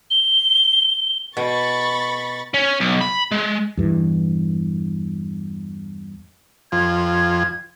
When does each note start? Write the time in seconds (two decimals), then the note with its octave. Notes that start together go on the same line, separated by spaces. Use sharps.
0.11 G7
1.37 B2 B5 C#6 A6
2.54 C#4
2.80 B1
3.01 B5
3.31 G#3
3.77 E2 G2 E3
6.72 F2 G#6